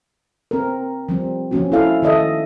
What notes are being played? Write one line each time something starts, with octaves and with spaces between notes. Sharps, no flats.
C4 A#4
F3 G3 C4
F3 A#3 C#4 F#4
E4 A4 F5
D#3 A4 D#5 E5